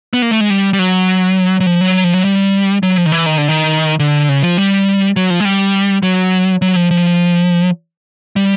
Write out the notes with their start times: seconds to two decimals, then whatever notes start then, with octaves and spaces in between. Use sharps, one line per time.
0.13 B3
0.22 A#3
0.31 A3
0.41 G#3
0.50 G3
0.73 G3
0.79 F#3
1.60 F#3
1.66 F3
1.81 F#3
2.04 F3
2.14 F#3
2.25 G3
2.83 F#3
2.97 F3
3.06 D#3
3.12 E3
3.26 D#3
3.38 D3
3.49 D#3
3.99 D3
4.29 C#3
4.43 F3
4.57 G3
5.16 F#3
5.30 F3
5.40 G#3
5.45 G3
6.03 F#3
6.62 F#3
6.76 F3
6.91 F3
8.36 G3